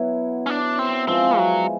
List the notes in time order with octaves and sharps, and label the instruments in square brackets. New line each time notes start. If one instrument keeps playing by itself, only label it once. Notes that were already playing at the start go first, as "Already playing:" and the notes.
Already playing: [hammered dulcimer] F#3 B3 E4
[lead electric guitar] C#4
D4
C4
[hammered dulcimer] F3 G#3 B3 E4 [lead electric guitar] C4
[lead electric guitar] F#3